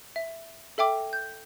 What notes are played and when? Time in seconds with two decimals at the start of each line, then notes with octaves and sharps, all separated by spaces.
0.16 E5
0.78 A4 E5 G5 D6
1.13 G6